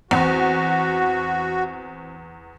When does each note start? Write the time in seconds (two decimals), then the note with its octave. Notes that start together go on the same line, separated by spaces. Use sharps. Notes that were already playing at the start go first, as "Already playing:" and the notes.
0.11 E2 C4 F#4